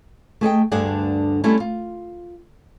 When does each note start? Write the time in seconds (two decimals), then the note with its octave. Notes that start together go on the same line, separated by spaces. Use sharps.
0.41 A3 G#4 D#5 G5
0.72 D2 G2 D3 D4 G#4 F#5
1.44 G3 A3 C4 C#4 E4
1.60 F4